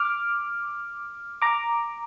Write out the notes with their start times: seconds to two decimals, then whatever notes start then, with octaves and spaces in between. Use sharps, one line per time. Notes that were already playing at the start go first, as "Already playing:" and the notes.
Already playing: D6 F6
1.42 A#5 D6